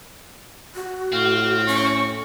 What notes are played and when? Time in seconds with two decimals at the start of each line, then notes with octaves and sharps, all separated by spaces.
0.75 F#4
1.13 A2 C4 F5
1.67 C#4 C#6